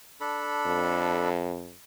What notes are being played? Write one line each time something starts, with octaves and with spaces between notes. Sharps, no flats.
D4 A4 B5
F2